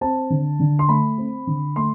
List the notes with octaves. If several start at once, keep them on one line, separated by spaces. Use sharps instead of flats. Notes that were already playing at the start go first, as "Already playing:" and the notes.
C4 A5
D3
D3
C6
A3 B5
C4
D3
A3 C6